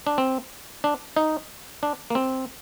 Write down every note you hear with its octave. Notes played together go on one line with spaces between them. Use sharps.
D4
C4
D4
D#4
D4
A#3
C4